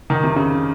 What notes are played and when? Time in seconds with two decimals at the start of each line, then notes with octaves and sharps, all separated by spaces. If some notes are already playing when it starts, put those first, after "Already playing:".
0.10 D#3
0.24 C3
0.36 C#3